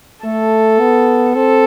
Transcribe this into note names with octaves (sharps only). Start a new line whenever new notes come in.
A3 A4
B3
C4 A4